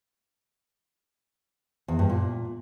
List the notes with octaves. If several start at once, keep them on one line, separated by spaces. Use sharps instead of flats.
E2
G2
A#2